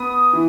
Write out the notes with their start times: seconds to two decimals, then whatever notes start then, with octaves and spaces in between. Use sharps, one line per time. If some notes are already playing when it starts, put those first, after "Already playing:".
Already playing: B3 D#6
0.33 E3